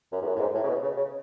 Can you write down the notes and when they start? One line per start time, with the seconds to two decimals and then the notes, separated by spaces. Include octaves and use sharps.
0.12 F#2
0.22 E2
0.27 F#2
0.36 A2
0.40 G#2
0.54 A2
0.64 C#3
0.68 B2
0.82 C#3
0.97 C#3